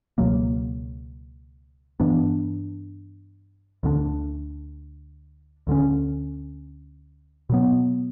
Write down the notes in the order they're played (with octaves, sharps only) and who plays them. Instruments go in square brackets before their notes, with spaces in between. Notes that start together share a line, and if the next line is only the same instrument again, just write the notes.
[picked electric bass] C#2 B2 F#3 A#3
G2 E3 B3 D4
D2 D3 A#3 D4
D2 D3 G3 C#4
B2 F#3 B3